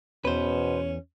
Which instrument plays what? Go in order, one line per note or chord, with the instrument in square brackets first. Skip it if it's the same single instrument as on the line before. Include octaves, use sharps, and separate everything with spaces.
[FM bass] E2 [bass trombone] B2 [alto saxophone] C#4 [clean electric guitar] B4 C5